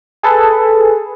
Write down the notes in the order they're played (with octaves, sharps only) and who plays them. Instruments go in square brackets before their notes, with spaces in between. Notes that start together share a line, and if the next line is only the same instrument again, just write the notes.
[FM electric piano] G#4 A4 B4